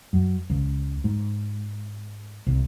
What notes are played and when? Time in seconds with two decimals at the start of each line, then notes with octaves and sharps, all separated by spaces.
0.13 F#2
0.50 C#2
1.04 G#2
2.47 C2